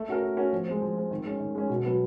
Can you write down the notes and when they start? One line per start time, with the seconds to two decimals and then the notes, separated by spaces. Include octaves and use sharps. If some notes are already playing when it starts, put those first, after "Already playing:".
Already playing: A3
0.08 C#4 F#4 A#4
0.22 A3
0.37 C#4 F#4 A#4
0.52 F3
0.67 G#3 C4
0.81 F3
0.97 G#3 C4
1.11 D#3
1.25 G#3 C#4
1.40 D#3
1.55 G#3 C#4
1.70 B2
1.85 F#3 B3